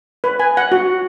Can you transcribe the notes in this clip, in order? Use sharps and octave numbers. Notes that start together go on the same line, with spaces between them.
B4
G#5
F#5
F#4